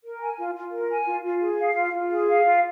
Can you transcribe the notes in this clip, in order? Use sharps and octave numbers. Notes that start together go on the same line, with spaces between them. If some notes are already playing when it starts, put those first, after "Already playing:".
A#4
G#5
F4
F4
A#4
G#5
F4
F4
G#4
F5
F4
F4
G#4
F5
F4